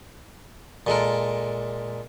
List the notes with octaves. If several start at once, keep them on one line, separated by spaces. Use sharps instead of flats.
A#2 G#3 A4 A#4